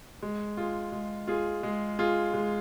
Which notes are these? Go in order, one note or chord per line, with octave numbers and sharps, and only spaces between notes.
G#3
F4 G#4
G#3
F4 G#4
G#3
F4 G#4
G#3